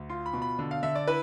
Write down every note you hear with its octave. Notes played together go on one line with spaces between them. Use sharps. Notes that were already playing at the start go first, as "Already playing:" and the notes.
Already playing: D2
F4 C6
B5
B2
B5
D3
F5
D3 E5
D5
E4 B4